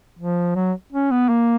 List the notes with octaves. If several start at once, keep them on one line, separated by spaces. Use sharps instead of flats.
F3
F#3
C#4
B3
A#3